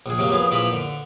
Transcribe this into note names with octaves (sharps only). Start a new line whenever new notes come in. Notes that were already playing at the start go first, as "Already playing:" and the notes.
A#1 G#4
C3 F#3 A#3
F3 B3 G#4
A#2 E3 F3 B5
D3